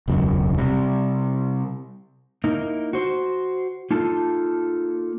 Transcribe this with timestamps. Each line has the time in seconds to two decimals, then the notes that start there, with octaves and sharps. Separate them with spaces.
0.08 E1 C#2 F#2
0.58 C3 G3
2.44 A#3 D#4 E4
2.93 F#4 C5
3.91 A#3 D#4 F4 A4 A5